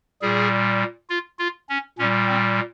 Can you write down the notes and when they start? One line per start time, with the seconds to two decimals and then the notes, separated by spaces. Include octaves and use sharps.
0.22 A#2 G3 G#4
1.10 F4
1.39 F4
1.69 C#4
1.98 A#2 G3 C#4
2.28 C4